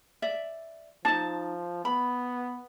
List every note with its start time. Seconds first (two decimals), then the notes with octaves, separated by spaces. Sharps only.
0.22 D5 E5
1.05 F3 D4 D#4 A5
1.85 B3 B5